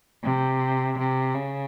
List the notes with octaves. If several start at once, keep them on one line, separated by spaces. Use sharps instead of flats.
C3
C3
C#3